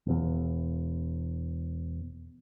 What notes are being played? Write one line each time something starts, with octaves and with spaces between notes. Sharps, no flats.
E1 E2